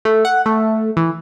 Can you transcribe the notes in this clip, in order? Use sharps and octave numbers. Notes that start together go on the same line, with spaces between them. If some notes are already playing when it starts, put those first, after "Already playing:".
A3
F#5
A3
E3